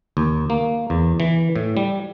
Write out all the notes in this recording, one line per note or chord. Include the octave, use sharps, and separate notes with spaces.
D#2
A#3
E2
E3
A2
G3